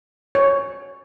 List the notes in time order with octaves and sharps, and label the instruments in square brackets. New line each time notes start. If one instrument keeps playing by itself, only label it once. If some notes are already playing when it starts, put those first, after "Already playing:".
[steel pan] C#5